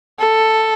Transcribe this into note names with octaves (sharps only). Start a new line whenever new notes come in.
A4